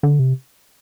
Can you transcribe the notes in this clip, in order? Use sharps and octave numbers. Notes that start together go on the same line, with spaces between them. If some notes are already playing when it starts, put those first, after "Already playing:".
D3
C3